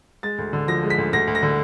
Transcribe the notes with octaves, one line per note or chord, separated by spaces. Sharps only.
G#3 A6
D2
D3
F3 A#6
G#3
B6
D2
D2 A#6
D2
A#6
D3